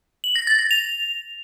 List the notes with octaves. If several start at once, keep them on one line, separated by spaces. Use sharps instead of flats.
F#7
A#6
A6
A#6
F7